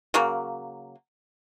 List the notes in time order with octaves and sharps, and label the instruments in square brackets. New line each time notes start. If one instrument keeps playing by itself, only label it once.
[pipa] C#3 F#3 A#3